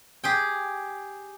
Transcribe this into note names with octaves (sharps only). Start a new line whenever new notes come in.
G4 G#4 G5